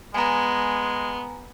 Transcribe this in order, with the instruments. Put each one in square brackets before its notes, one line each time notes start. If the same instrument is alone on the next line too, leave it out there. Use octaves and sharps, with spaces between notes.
[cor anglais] G#3 [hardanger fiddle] B3 [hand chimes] G#5 A#5